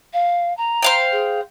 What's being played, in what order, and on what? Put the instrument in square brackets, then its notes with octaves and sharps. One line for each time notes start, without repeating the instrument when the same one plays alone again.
[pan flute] F5
A#5
[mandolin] C5 F5 G5
[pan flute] G#4